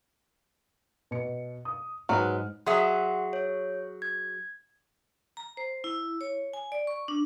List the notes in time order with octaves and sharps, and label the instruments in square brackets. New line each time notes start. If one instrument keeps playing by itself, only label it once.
[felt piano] B2 C#7
D#6
[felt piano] G#2 F6 [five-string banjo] F#3 G#3 B4
[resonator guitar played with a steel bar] F#3 G#4 E5 [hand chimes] F#5 C6
[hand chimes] C#5
G#6
[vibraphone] A#5
C5
E4
C#5
G#5
D5
C#6
D4